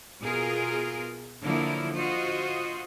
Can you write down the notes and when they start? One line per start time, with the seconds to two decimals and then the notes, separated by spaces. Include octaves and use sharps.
0.23 B2 F4 G#4 A#4
1.44 D3 F3 F#3 A#3 E4 A#4
1.95 F4 F#4 C5 D#5